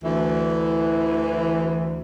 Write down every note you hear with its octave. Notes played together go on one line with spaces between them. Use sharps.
D2 E3